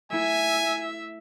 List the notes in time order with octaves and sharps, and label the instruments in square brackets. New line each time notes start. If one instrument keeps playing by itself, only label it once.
[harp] A3 E4 [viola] E5 [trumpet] G#5